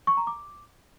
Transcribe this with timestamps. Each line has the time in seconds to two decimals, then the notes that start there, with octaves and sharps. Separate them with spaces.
0.07 C#6
0.17 A#5
0.27 D6